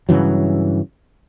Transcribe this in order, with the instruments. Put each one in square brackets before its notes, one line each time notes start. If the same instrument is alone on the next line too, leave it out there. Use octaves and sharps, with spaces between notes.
[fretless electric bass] G2 C#3 E3 F#3